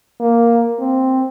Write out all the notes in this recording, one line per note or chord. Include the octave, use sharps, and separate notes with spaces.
A#3
C4